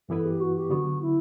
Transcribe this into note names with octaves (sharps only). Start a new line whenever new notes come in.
G2 E3 B3 E4 A4 B4
G4
F#4
G4
D3 F#3 B3 F#4
E4